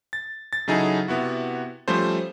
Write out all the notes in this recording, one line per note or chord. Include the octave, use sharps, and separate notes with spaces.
A6
A6
C#3 F#3 D#4 E4 G#4 A4
C3 B3 E4 F#4
F3 G3 A3 C#4 C5